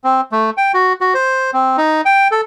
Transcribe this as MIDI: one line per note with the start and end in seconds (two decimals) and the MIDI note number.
0.04 0.21 60
0.32 0.50 57
0.57 0.72 79
0.74 0.93 66
1.01 1.14 66
1.14 1.51 72
1.53 1.77 60
1.78 2.01 63
2.05 2.28 79
2.31 2.41 69